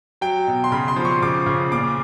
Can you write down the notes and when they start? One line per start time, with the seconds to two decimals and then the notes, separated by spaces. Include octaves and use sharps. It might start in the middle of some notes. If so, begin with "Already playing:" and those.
0.21 F#3 G5
0.47 B2
0.64 C6
0.72 C#3 B5
0.88 C6
0.96 F3
1.05 C#6
1.22 C#3 D6
1.46 C#3
1.72 A#2 D6